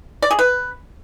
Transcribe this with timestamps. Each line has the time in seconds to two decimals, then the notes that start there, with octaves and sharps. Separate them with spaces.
0.22 D5
0.31 G#4
0.39 B4